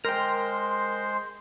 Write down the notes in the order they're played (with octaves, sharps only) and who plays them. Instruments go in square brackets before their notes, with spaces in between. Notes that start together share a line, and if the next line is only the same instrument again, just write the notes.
[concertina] G#3 C5 C6 [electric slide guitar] A#4 G5